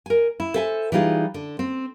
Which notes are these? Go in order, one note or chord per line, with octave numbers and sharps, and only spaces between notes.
A#4 G#5
E4
A4 C5 E5 G5 G#5
E3 G3 D#4 F4 G#4
D3
C4